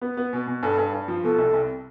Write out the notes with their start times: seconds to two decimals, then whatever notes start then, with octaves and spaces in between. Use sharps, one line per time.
0.02 B3
0.17 B3
0.33 B2
0.47 B2
0.63 G2 A4
0.78 G2
0.93 G2
1.08 F3
1.24 B2 A4
1.38 C2
1.53 C2